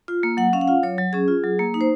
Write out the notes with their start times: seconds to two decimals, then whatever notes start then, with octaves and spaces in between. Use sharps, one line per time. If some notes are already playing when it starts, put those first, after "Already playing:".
0.08 F4
0.23 A#3
0.37 F#3 F#5
0.53 C#4 F5
0.61 F#5
0.68 F4 F5
0.83 F#3 C#5
0.98 F#3
1.13 C#4 G#4
1.28 F4
1.44 F#3
1.59 A#3
1.74 D#4
1.81 C5